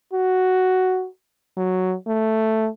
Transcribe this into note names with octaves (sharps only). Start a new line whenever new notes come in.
F#4
F#3
A3